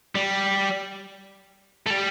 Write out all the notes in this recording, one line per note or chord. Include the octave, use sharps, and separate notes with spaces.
G3
A3
G3